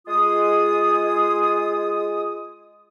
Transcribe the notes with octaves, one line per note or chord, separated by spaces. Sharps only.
G#3 F4 D#6